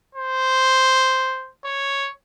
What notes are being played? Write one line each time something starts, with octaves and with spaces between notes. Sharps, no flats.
C5
C#5